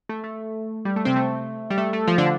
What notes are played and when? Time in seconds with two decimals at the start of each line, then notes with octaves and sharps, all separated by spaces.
0.09 A3
0.24 A3
0.85 G3
0.96 A3
1.05 C3 C4
1.16 A3
1.70 G3
1.78 A3
1.93 A3
2.07 F3 F4
2.18 D3 D4